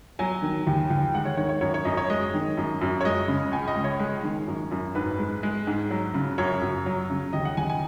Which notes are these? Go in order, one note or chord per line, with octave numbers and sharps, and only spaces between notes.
F#3 G#5
D#3
D#2
D#2
G#3 F#5
C#5
D#3 C#5
C#5
F#2 C#5
C#5
F#2 D#5
C#5
G#3 D#5
D#3
F#2
F#2
C#5
G#3 D#5
C#3
C#2 G#5
D#5
C#2
C#5
G#3
D#3
F#2
F#2
G#2 B4
G#3
G#3
G#2
F#3
C#3
F#2 C#5
F#2
F#3
C#3
D#2 D#5
F#5
D#2 G#5
G#5